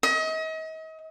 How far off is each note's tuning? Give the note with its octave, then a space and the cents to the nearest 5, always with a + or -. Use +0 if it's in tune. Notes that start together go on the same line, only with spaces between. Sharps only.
D#5 +40